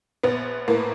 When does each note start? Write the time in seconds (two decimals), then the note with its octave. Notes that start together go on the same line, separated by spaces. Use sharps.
0.23 A#1 B3
0.68 A2 A#3